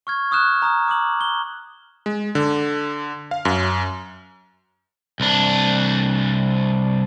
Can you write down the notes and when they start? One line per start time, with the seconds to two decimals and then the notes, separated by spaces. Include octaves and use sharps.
0.07 C#6 F6 G#6
0.31 C#6 D#6 F6 F#6 E7
0.62 A#5 D#6 F6
0.88 D6 D#6 F#7
1.21 G7
2.06 G#3
2.35 D3
3.31 F5
3.45 F#2
5.20 C2 D4